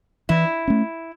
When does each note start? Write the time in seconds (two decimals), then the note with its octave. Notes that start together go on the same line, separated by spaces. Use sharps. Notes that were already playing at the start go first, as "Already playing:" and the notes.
0.29 E3 E4
0.68 A3 C#4